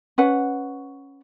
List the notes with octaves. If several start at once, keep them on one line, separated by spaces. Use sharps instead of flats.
C#4 B4 F#5